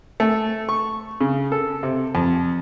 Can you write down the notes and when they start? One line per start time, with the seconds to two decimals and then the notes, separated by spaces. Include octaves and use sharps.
0.20 A3
0.69 C#6
1.21 C#3
1.52 A4
1.83 C3
2.15 F2